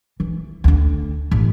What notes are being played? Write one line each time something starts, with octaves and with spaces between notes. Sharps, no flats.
E3
D2 D4
A1